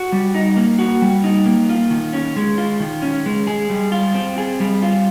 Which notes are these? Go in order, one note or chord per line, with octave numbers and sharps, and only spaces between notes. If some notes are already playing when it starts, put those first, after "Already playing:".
Already playing: F#4
G3
D#4
A#3
F#4
G3
D#4
A#3
F4
D#3
C#4
G#3
F4
D#3
C#4
G#3
G#4
G3
F4
C4
G#4
G3
F4